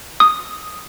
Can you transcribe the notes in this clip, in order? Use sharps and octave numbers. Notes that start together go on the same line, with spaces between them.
D#6